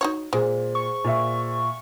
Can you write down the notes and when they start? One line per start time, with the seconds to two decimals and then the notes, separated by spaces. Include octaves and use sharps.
0.01 D#4 F#4 C#5
0.33 A#2 G#3 G#4 C5
0.75 C#6
1.04 A#2 E5